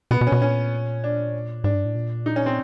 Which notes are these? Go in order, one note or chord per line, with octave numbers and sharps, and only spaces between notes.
B2 B3
B2
C#4
B2
A#2 C#4
D4
G#2 D4
G2
A2
A#2
D#4
C#4
C4